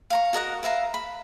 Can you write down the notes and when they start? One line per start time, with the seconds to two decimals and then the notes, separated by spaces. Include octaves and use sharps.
0.10 F5 A#5 C#6
0.33 F#4 A#4 D#5 F#5
0.63 B4 E5 F5 A#5
0.94 B5